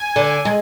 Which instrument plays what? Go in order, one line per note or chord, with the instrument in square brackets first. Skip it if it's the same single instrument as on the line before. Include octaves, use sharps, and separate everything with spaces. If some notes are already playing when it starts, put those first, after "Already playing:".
Already playing: [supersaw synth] G#5
[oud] D3
G#3